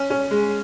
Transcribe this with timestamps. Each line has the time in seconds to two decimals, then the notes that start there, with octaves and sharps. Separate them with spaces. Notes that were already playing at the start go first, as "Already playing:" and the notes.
Already playing: C#4
0.10 C#4
0.31 G#3